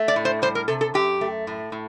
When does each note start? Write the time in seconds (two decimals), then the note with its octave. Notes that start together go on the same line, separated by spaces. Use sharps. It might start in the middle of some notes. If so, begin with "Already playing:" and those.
Already playing: A3
0.08 D5
0.16 A2
0.25 C5
0.42 G3 C5
0.55 A#4
0.68 C3 A4
0.81 A4
0.94 F#2 G4
1.21 A3
1.47 A2
1.72 A2